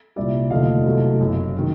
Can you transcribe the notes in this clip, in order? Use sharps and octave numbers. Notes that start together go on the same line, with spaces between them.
C2 A#2 G3 D5 E5
F1 D#2 D3 F3 A3 D#5 F5
C2 B2 F#3 A3
F#1 F#2 C#3
D#3 F#3